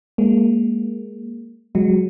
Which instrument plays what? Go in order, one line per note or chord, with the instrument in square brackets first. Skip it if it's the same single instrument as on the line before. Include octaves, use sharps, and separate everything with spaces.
[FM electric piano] G#3 A#3
F#3 G#3